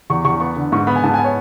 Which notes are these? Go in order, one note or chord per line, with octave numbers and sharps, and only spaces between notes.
E2 C#6
E2 C#6
B3 C#6
D3
G#2 C#6
B3 B5
G#5
G#2 A5
B3 G#5
C#5